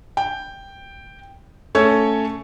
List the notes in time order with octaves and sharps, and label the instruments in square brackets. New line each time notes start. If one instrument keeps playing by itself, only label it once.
[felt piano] G5
A3 C#4 A4 C#5